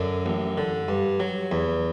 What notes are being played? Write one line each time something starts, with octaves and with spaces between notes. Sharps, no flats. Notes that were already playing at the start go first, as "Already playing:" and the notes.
Already playing: F#2 D3 D4
A1
D3
G2
F#3
E2